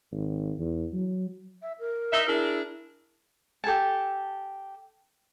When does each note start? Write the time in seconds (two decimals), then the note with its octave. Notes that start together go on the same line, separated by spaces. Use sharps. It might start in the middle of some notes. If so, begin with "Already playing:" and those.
0.12 G#1
0.59 E2
0.93 F#3
1.62 E5
1.80 A#4
2.12 D#4 E5
2.27 D4 E4 G#4 A#4
3.64 G4 A4 G#5 A5